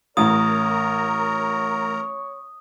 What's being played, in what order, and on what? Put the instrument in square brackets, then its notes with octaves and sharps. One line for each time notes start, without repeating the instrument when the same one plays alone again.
[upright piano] A1 [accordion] A#4 A#5 [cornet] C#5 [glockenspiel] D#6